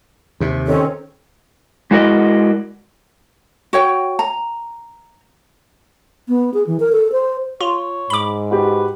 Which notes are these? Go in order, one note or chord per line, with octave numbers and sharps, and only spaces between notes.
D#2 C3
D#3 C4 C#4 A4
G#3 E4 F#4 A#4 D5 D#5
F#4 C#5 G5
A#5
B3
G#4
E3
A#4
A4
C5
F4 C#5
G#2 B5 D6
F#4 G4 B4